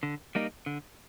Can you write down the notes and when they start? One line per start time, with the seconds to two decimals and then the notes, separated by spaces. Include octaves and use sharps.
0.03 D3
0.35 G3 A#3 D#4
0.66 D3